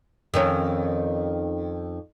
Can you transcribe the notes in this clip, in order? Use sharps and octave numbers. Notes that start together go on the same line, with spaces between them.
F2 D#3 C#4